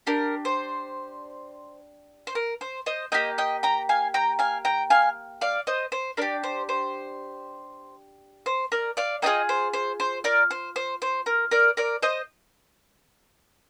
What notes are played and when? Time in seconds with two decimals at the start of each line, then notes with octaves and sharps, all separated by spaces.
0.07 D4 G4 A#4
0.45 C5
2.27 C5
2.35 A#4
2.61 C5
2.86 C5 D#5
3.12 A#3 D#4 G4 D#5 G5
3.38 D#5 G5
3.63 G5 A#5
3.89 F5 G#5
4.14 G5 A#5
4.39 F5 G#5
4.65 G5 A#5
4.90 F5 G#5
5.41 D5 F5
5.67 C5 D#5
5.92 C5
6.17 D4 G4 A#4 D5
6.43 C5
6.69 C5
8.46 C5
8.72 A#4 D5
8.97 D5 F5
9.22 A#3 D4 F4 G#4 D#5 G5
9.49 C5
9.73 C5
10.00 C5
10.24 A#4 D5
10.51 C5
10.76 C5
11.02 C5
11.26 A#4
11.51 A#4 D5
11.77 A#4 D5
12.03 C5 D#5